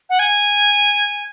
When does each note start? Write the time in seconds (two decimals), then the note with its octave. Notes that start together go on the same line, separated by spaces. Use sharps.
0.10 F#5
0.19 G#5